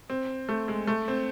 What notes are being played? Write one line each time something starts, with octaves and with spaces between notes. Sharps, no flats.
C4
A3
G#3
A3
C4